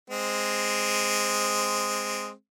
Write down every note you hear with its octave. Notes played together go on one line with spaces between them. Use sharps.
G#3 C4